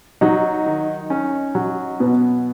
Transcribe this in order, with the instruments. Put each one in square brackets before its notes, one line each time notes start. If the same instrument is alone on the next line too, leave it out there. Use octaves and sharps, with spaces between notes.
[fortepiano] F#3 [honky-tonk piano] D#4
[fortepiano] D#3
C#4
F#3
[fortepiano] B2 [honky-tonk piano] B3